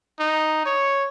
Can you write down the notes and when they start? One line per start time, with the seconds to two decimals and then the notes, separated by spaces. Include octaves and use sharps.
0.19 D#4
0.66 C#5